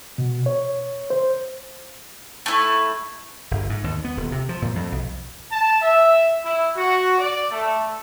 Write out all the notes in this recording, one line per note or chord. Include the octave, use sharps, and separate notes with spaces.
B2
C#5
C5
A3 E4
G1
G#2
D#2
B3
D#1
C3
F3
A#2
F2
B1
A5
E5
E4
F#4
D5
A3